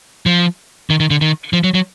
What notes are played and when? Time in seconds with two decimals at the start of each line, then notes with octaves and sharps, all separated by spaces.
0.26 F3
0.90 D#3
1.00 D#3
1.10 D3
1.21 D#3
1.53 F3
1.64 F#3
1.74 F#3